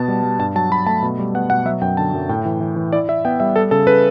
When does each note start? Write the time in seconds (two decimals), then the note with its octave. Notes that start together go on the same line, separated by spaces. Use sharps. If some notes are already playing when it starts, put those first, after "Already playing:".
Already playing: B2 B3 A5
0.08 G3
0.23 G3
0.39 G2 A5
0.55 F#3 A5
0.71 F#3 B5
0.86 A3 A5
1.02 B2
1.19 G3
1.34 B3 F#5
1.50 B2 F#5
1.65 F#3 E5
1.81 F#2 G5
1.97 D3 A5
2.14 F#2
2.29 A2 G5
2.45 E3
2.61 E3
2.76 E3
2.93 E4 D5
3.09 E4 E5
3.25 B3 G5
3.40 G3 E5
3.56 G3 A4
3.71 C#3 A4
3.87 C#3 B4